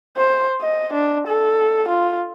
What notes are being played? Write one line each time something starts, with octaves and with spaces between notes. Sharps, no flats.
C5
D#5
D4
A4
F4